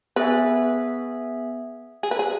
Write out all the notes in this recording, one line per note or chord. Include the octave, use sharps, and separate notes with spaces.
B3 G#4 B4 E5 G#5
G#4
B4
G#4